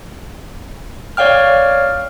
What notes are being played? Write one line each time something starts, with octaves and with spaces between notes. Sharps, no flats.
C#5 D5 F5 G5 F6